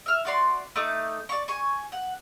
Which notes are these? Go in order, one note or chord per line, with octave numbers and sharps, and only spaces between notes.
E5 F6
F#4 D5 C6
A3 D#4 D6
D5 C#6
G#5 C#6
F#5